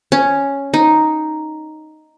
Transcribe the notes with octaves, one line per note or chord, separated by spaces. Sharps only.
C#4
D#4